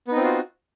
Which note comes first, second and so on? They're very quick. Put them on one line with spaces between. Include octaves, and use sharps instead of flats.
B3 D#4 C4 F4 F#4